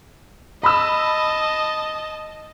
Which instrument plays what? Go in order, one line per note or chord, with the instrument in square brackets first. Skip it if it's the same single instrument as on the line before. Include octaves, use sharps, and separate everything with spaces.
[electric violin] D#5 A5 [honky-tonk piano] B5 E6